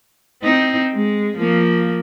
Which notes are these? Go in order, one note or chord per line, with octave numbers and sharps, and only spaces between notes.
C4 D#4
G#3
F3 A#3